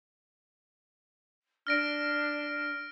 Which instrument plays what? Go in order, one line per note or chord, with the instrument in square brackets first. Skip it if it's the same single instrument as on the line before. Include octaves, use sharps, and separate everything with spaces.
[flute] D4 [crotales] F6 A#6 D7